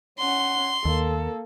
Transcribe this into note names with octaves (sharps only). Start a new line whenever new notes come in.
C#4 F#5 C6
D#2 A#3 A4